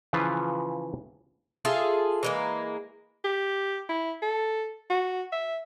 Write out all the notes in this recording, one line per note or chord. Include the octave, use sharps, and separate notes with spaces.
C#3 E3 F3 F4 B4
F4 G#4 A4 E5
E3 G#3 A#3
G4
E4
A4
F#4
E5